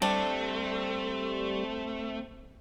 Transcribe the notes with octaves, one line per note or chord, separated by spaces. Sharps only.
G3 A3 C4 D4